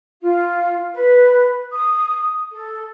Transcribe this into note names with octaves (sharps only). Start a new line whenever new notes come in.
F4
B4
D#6
A4